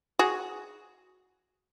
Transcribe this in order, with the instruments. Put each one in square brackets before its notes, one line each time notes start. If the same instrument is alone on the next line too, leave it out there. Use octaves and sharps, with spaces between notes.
[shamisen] F#4 G#4